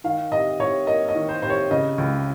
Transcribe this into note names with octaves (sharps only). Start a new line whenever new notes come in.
D#3 F5
C3 D#5
C3 C#5
A#3 D#5
D#5
D#3
C5
C3 C5
C#5
C#3 D#5
C#2